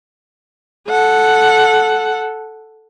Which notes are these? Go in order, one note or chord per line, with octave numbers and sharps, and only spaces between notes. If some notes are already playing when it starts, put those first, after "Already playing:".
A4 F#5